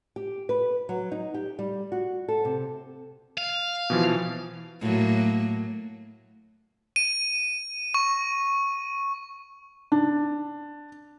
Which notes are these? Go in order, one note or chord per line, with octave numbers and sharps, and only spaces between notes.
G4
B4
F#3
D#4
G4
G3
F#4
A4
C3
F5
B2 E3 F3
A2 F#3 A#3
D#7
C#6
D4